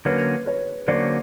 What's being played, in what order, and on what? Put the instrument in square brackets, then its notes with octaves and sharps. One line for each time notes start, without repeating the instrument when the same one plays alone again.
[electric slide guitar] D3 F#3 A#3 C#4 [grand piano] B4 C#5
[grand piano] B4 C#5
[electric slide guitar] D3 F#3 A#3 C#4 [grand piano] C5 D5